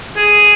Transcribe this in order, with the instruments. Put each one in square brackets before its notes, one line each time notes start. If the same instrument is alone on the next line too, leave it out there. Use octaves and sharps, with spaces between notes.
[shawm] G#4